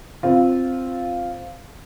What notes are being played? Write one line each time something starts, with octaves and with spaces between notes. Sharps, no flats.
C4 F4